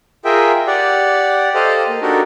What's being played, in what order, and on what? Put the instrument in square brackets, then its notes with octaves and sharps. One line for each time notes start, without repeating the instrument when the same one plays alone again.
[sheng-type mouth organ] F4 G#4 A#4 E5 G5
G4 D5 F#5
G4 A4 C5 D#5 F5
A#3
D4 D#4 F#4 G4 A4 A#4